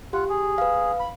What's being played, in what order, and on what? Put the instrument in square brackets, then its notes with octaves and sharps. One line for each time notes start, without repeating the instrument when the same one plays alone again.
[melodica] F4 F#5 [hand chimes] G4
[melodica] G#4
[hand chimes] B4 F5
[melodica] B5